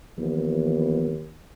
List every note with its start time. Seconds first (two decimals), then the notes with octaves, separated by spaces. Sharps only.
0.18 D#2 E3 F3 B3